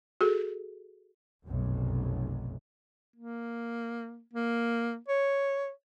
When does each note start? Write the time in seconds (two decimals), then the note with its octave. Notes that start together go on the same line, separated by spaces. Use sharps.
0.21 F#4 G#4 A4
1.46 F1 B1 F#2
3.16 A#3
4.33 A#3
5.09 C#5